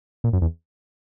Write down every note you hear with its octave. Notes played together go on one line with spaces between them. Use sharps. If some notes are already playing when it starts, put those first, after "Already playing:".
A#2
F#2
E2